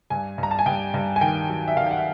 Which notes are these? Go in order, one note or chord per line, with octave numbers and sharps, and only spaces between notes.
G2 G#5
G2
A#5
A5
G#5
G2 G5
G2
G#5
D#3 G5
F#3
E5
D#3 F5
G5
F#5
E5